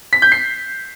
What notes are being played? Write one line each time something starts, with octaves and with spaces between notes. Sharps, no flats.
B6
G6
C7